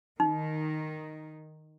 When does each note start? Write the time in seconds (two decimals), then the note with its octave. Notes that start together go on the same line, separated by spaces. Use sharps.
0.20 D#3 D#4